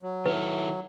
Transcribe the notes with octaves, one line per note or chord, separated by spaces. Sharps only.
F#3
D#3 E4 A4 B4